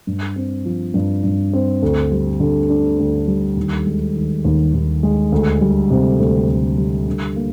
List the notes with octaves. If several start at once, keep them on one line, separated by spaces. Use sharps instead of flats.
G2
C4
F3
G2
G2
C4
D2
G3
D3
D4
D2
G3
D#2
G#3
D#3
D#2
D#2
G#3
D2
G3
C3
D2
D2
G3
D3
A#3